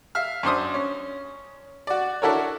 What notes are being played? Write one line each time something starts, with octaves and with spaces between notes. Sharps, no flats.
E5 F5 F6
F#2 D4 C5 D#6
C#4
F#4 D5
D4 E4 F#4 A4 A#4 C#5